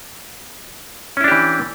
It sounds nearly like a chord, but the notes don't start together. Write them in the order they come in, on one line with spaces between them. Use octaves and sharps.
C#4 E4 D4 G4 E3